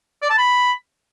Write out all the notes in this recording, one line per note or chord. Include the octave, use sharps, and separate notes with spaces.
D5
A5
B5